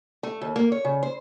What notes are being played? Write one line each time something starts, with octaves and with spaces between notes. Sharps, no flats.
A3
D#2
A#3
C#5
C#3
C5